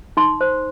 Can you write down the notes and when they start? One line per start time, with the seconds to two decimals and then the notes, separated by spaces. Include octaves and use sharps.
0.17 D#4 C6
0.41 C5